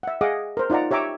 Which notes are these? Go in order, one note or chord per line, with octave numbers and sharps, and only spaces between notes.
E5 F#5
G#4 D#5 F5 F#5 D6 D#6
A#4 C5
D#4 F4 D5 F#5 A#5
G4 C#5 E5 A#5 D6